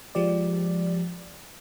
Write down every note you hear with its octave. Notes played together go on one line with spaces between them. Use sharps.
F3 G#3 G4 D5